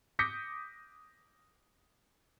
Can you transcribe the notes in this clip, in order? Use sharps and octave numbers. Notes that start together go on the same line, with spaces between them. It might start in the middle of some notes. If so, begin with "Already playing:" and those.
D6 D#6 G6 A#6 B6 C#7